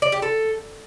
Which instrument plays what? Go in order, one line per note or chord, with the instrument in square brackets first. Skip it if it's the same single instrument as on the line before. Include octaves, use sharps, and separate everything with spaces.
[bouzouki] D5
G4
A4